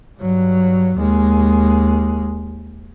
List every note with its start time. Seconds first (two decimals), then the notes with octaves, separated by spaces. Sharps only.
0.19 G2 F#3
0.97 D#2 G#3